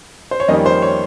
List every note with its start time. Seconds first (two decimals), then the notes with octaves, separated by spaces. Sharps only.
0.31 C5
0.40 C#5
0.48 F2 D#3 G3 A#3 C#4 D#5
0.66 C5
0.82 C#5